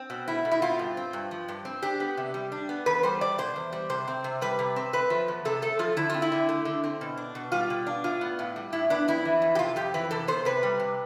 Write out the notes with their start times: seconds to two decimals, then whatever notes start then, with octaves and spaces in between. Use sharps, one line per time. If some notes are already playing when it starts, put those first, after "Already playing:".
Already playing: C4
0.10 B2
0.28 A3 E4
0.45 B2
0.52 E4
0.62 C4 F4
0.79 G2
0.97 C4
1.13 G2
1.31 F3
1.48 G2
1.65 C4
1.82 D4 G4
2.00 B3
2.17 C3
2.34 G3
2.52 D4
2.69 B3
2.86 E2 B4
3.03 G3 C5
3.21 E2 D5
3.38 B2 C5
3.56 E2
3.72 G3
3.89 C3 C5
4.08 C4
4.24 C3
4.41 G3 B4
4.59 C3
4.76 C4
4.93 A3 B4
5.10 F3
5.28 E2
5.45 C3 A4
5.62 A3 A4
5.79 F3 F4
5.97 D3 E4
6.10 C4 F4
6.22 E4
6.32 D3
6.49 A3
6.65 D3
6.84 C4
7.01 B2
7.17 D4
7.35 B2
7.52 G3 F4
7.70 B2
7.87 D4
8.04 A2 F4
8.21 B3
8.39 A2
8.56 G3
8.72 A2 E4
8.90 B3 D4
9.08 F2 E4
9.25 E3
9.42 F2
9.55 G4
9.59 C3 F4
9.76 F2 G4
9.94 E3 B4
10.11 C3 A4
10.28 B3 C5
10.45 C3 B4
10.63 G3
10.80 C3